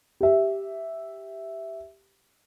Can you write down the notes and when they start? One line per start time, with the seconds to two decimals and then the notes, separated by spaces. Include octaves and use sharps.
0.21 G4 E5